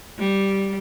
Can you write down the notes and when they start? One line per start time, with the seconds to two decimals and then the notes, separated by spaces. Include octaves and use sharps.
0.18 G3